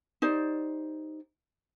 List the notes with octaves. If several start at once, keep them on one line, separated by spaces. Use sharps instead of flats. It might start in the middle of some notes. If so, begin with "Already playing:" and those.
D#4 G4 C5 D5